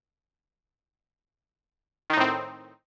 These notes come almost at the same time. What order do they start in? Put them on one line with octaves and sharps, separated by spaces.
D#3 D#4 A2 C4